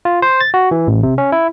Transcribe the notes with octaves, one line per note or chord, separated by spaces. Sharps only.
F4
C5
A6
F#4
E3
A1
C3
C#4
E4